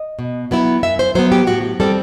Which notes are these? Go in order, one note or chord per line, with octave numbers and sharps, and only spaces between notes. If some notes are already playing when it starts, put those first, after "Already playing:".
Already playing: D#5
B2
F#3 B3 E4
F#2 E5
C5
F#3 B3 C5
G4
A2 F#4
G3 C4 A4